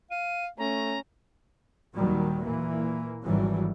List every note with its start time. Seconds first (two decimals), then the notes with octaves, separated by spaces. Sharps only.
0.11 F5 D#7
0.58 A3 C#4 A#5
1.96 D#2 A#2 D#3 F#3 G3
2.43 A#2 E3 A#3
3.25 G#1 E3 F#3 G3